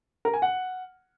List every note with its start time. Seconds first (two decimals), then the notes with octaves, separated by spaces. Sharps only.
0.25 A#4
0.34 G#5
0.42 F#5